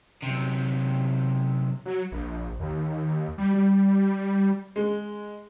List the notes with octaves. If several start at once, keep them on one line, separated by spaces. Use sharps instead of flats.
F#2 C3
F#3
A#1
D#2
G3
G3
G#3